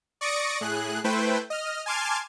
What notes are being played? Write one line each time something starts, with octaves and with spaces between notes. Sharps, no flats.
D5 C#6 D#6 A#6 C#7 D7
A2 G#4 F#6
A3 E4 B4 C5 G5
D#5 F6
G#5 A5 C6 D6 F6 G#6